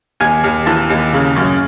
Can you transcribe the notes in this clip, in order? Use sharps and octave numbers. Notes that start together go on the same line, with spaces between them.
D#2 G#5
D#2
E3 A5
D#2
C#3
F#2